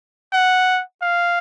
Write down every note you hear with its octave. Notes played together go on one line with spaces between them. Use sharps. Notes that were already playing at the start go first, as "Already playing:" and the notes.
F#5
F5